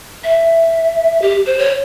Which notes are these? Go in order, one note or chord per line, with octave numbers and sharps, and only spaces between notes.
E5
G4
C5
C#5